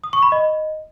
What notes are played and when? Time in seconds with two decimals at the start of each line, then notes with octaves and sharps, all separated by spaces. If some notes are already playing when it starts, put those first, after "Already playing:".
0.04 D#6
0.13 C#6
0.23 B5
0.32 D#5